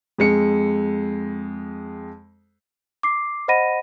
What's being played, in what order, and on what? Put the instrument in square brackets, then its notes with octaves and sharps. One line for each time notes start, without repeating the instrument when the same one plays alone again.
[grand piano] F2 G#3 C#7
[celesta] D6 C7
C5 D#5 F#5 B5 A#6 D#7